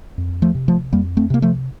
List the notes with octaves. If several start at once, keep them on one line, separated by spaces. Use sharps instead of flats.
F2
F3 A3
C3
F3 A3
F2 G3 A#3
A3 C4
C3 A#3
F3 A3